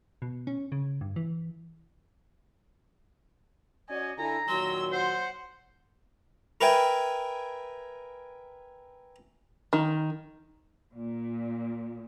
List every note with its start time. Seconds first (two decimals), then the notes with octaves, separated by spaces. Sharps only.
0.22 B2
0.47 C#4
0.72 C#3
1.01 G2
1.16 E3
3.89 C#4 F#4 D5 D#5 G#5
4.18 D3 E4 A4 G#5 A#5
4.48 A#2 D#3 F#3 C6 E6
4.92 C5 F#5
6.61 A#4 B4 E5 G5 G#5
9.73 D#3
10.94 A#2